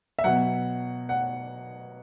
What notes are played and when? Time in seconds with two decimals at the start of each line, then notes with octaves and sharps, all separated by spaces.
0.19 E5
0.24 B2 F#3 F#5
1.09 F#5